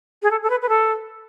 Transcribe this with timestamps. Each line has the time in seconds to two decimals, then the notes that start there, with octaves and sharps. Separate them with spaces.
0.22 G#4
0.31 A4
0.43 A4
0.50 B4
0.62 B4
0.69 A4